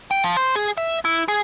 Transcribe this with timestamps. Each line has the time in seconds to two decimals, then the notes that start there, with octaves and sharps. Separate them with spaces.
0.11 G5
0.24 F3
0.37 C5
0.56 G#4
0.78 E5
1.05 E4
1.28 G#4